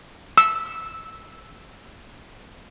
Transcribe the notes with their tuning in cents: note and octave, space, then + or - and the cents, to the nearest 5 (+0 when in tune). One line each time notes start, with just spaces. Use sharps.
E6 -5